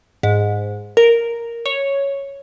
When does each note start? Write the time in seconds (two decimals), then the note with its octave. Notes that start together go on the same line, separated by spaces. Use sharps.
0.23 G#2
0.97 A#4
1.66 C#5